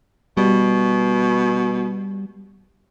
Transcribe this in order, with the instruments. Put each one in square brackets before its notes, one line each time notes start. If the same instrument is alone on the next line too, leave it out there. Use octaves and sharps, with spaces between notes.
[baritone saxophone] B2 [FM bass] G3